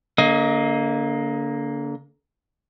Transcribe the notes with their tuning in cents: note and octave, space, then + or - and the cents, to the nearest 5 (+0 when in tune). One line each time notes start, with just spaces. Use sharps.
D3 -35 A#3 +0 D#5 +30